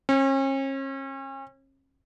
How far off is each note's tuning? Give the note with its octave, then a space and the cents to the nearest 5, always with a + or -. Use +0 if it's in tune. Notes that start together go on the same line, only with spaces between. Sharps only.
C#4 -40